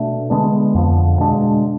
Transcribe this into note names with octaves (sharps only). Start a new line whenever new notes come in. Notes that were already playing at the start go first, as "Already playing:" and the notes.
Already playing: B2 A3 D4
D3 G#3 B3 D4
F2 D3 F3
B2 G#3 D4